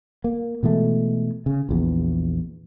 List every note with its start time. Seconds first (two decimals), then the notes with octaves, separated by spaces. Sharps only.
0.24 A#3
0.63 B2 E3 G#3 A3
1.46 C#3
1.69 A#1 E2